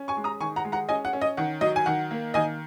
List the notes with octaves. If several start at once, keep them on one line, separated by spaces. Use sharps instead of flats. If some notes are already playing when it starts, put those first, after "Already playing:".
Already playing: C#4
G#5 C#6
G#3
A#5 D#6
D#3 G#5 C#6
F#5 A#5
G#3
F#5 A#5
C#4 D#5 G#5
F#5
C#4
D#5
D#3 F#5
F#3 D#5
G#5
D#3 F#5
A#3
D#3 D#5 G#5